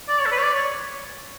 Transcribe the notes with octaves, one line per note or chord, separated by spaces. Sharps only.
D5
C#5
A4
B4
C#5
D5
C#5